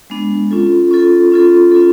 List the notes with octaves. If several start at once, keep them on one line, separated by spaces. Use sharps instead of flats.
G#3 B3 D4
C#4 F4 A4
C#4 F4 A4
C#4 F4 A4
C#4 F4 A4